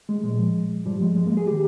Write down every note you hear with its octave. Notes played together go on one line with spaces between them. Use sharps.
G#3
A#2 F3 G#3
G#2 F3 G3
G#3
G#3
A#3
G#4
D#3 G4